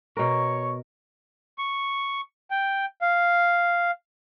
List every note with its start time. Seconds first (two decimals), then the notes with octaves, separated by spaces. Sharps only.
0.17 B2 A#4 C#5 C#6
1.58 C#6
2.51 G5
3.01 F5